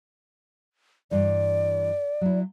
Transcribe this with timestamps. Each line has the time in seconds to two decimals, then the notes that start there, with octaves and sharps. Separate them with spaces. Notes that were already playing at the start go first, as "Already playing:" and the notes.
1.11 G2 E3 D5
2.21 F#3 E4